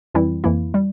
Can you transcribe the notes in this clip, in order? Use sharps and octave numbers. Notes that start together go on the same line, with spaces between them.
F2 E3 G3 C4 E4
F2 E3 A#3 E4
G3